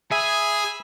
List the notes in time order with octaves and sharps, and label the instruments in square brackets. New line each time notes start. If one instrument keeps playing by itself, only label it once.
[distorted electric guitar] G#4 [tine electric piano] E5 [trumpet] G#5 [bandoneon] B5 E6